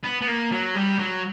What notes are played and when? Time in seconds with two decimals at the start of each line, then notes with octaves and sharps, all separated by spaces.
0.04 B3
0.22 B3
0.28 A#3
0.52 F#3
0.75 G3
0.99 F#3